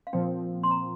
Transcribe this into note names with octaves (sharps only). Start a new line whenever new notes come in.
F5
A#2 F3 C4 G5
C6
A#5